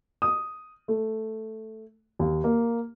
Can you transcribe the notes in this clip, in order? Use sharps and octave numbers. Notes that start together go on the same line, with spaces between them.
D#6
A3
D#2
A#3